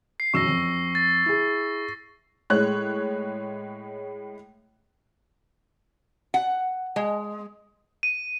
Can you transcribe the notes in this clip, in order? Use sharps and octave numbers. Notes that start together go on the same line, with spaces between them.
C7
E1 F#2 C#6 E6 A#6 E7
F2
A6
E4 G#4
A2 G#3 C#5 F#6
F#5
G#3
D#7